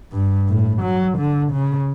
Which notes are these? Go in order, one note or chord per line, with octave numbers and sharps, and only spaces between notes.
G2
A2
F#3
D3
C#3